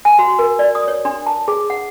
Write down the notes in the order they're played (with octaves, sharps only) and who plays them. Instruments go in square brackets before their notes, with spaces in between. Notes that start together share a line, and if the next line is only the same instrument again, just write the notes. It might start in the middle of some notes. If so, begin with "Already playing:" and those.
[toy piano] G#5
F#4
A#4
D5
D#6
C#5
D4
A5
G#4
F#5